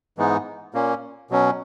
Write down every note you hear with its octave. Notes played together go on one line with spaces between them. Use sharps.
G#2 E3 G#3 B3 D#4
A#2 A#3 C#4
B2 F#3 C#4